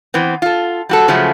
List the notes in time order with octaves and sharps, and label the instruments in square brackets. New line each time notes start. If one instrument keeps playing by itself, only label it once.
[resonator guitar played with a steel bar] E3 B3 C4
F4 A4
G3 F#4 A4
C#3 F3 F#3 G#3 A3 C#4